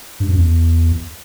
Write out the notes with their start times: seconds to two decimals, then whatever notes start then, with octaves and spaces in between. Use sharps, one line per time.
0.20 G2
0.29 F#2
0.37 E2